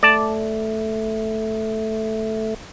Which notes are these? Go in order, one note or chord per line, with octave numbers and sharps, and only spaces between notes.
A3 D5 A5